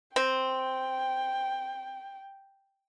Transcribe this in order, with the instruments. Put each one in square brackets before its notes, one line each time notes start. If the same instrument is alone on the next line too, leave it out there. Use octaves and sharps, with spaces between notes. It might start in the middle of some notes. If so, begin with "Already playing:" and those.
[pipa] C4 [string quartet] G5